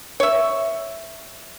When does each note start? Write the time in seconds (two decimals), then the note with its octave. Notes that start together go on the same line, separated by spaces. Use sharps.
0.20 C#5 E5